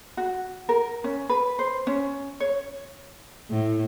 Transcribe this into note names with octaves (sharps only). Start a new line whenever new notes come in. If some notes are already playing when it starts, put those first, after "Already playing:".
F#4
A#4
C#4
B4
C5
C#4
C#5
A2